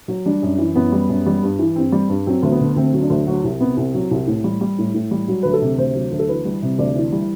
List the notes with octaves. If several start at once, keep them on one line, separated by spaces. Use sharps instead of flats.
F#3
G3 D4
F#2
E3
F#2 B3
G3
F#2
G3
G2
E3
G2 C4
G3
G2
F#3 C4
D2
B3
D3
D2 C4
F#3
D4
D2
F#3 F#4
C2
C3 B3
C2 C4
F#3
C2
A2
G3
G3
A2
A2
G3
F#3 F#4
D2 B4
A4
C3
D2 C5
F#3
D2
A4
E3 B4
G3
C3
D2 D5
E3
G3